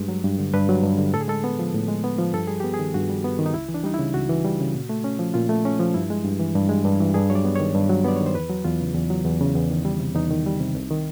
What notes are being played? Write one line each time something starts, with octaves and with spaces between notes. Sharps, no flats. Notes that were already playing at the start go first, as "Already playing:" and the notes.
Already playing: G2 G#3
F#3
G2
D3
G2 B4
F#3
G2
D3
A2 A4
G#4
G#3 A4
B3
F3
A2
G#3
B3
F3
G2 A4
G3 G#4
B3 G4
G#4
D#3
G2 F#4
G3
B3
D#3
D#4
C#2 E4
E3
D4
G3 D#4
C#3 E4
C#2 F#4
E3
G3
C#3
A#2
A3
C#4
F3
A#2 F4
A3
C#4
F3
G2 E4
G#3
G2
E3
G2
G#3
G2
E3
G2 G#4
F#3 C#5
D5
B3
D#3 C#5
G2
F#3
B3 D5
C#5
D#3
C5
E2 B4
F#3
E2 F4
C#3
E2
F#3
E2
C#3
E2
D#3
G3
C3
E2 D#4
D#3
G3
C3
C2
D#3